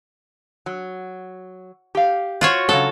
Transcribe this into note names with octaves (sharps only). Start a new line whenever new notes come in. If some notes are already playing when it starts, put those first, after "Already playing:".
F#3
G4 F5
F4 F#4 C#5
C#3 F#3 A4